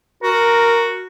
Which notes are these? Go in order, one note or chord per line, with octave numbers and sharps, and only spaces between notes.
F#4 A#4